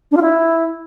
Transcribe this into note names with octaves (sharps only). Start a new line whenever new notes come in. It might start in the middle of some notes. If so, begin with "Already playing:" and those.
D4
F4
E4